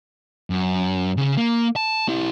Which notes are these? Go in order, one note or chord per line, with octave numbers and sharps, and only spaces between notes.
F#2
C#3 G#4
A#3
A5
E4 G4